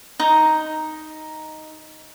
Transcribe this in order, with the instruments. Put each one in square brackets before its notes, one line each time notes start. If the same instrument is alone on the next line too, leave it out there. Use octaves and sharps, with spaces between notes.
[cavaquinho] D#4 A#5